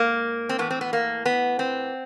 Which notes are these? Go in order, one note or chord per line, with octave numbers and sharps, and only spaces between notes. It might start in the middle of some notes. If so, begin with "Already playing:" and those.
Already playing: G#2 A#3
C4
A2 E3 B3
C4
B3
A#3
B3
C4